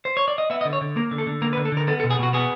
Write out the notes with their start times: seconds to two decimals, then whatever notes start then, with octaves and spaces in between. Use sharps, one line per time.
0.05 C5
0.17 C#5
0.28 D5
0.38 D#5
0.50 B3 E5
0.61 D#5
0.65 D3
0.73 C#5
0.81 D3
0.96 A#3 A#4
1.11 D3
1.18 A4
1.27 D3
1.42 A#3 A#4
1.53 B4
1.57 D3
1.65 A4
1.72 D3 A#4
1.87 B3 A4
2.00 A4
2.04 B2
2.11 G#4
2.19 B2 F#4
2.33 B3 G#4